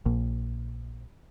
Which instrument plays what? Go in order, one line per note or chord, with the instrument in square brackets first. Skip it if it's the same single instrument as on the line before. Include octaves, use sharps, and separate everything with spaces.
[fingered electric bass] A#1 A#2